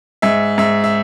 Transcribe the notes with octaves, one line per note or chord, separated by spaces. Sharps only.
G#2 E5
G#2 E5
E5